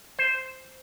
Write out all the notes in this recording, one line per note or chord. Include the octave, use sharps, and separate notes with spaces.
C5